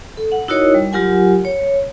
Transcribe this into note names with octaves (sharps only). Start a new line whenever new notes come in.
A4
F#5
D#4 E4 F#4 A#4 C#5 D#5
G3
F#3 F4 G4 A#4 F#5 G#5
C#5